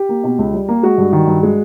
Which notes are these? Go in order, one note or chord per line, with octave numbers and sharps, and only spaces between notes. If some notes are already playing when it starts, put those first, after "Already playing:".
Already playing: G4
A#3
B2
C#2
G3
A#3
G#3 F#4
G2
D#3
G2
G#3